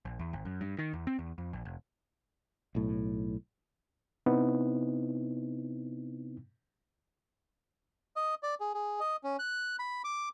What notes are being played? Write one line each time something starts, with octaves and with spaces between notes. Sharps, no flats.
A#1
E2
G#1
F#2
G2
D#3
E2
C4
E2
F2
A#1
F1
B1 A2
C3 B3 C4 D#4 E4
D#5
D5
G#4
G#4
D#5
C#4
F#6
B5
D6